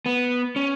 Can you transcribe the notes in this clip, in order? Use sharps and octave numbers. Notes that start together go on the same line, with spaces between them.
B3
C#4